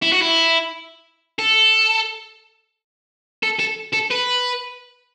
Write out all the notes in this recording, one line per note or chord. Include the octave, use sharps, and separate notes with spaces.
E4
F#4
E4
A4
A4
A4
A4
B4